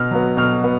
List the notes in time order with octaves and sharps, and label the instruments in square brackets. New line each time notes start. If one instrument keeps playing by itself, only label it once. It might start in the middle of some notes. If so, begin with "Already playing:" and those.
Already playing: [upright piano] B2 F6
F#3 B3
B2 F6
B3